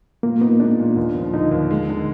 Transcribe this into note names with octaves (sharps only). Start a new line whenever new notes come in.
A#2 A#3
B3 D#4
G#3 D4
A#2
D#2
F3
D3 D#4
D#2
G#3
D3